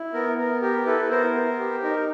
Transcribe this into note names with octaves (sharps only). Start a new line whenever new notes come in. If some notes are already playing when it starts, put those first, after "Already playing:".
Already playing: E4
B3 A#4
B3 A#4
G4 A#4
E4 A4 B4
B3 A#4 C5
B3
G4
D#4 A#4